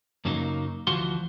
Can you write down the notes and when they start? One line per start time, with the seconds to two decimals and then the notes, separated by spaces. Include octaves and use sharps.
0.25 F#2 C#3 F#3 A#3 C#4 D#4
0.87 D2 E3 F3 F#4 C6